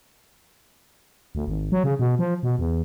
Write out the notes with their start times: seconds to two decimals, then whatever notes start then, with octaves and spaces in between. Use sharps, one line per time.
1.35 D2
1.48 G#1
1.72 F#3
1.84 C#3
1.99 B2
2.19 F3
2.43 B2
2.59 E2